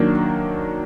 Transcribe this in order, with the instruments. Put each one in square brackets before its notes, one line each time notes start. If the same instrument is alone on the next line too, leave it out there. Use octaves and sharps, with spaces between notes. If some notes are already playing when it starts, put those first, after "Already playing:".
Already playing: [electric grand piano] D#3 F#3 A#3 D4